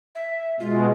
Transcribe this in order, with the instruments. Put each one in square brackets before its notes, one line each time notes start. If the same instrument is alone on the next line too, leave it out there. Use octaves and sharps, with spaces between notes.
[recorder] E5
[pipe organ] B2 G#3 [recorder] F4